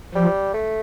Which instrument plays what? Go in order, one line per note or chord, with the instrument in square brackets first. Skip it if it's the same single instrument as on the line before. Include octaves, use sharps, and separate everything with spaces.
[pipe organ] F3 [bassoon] G3
[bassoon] A3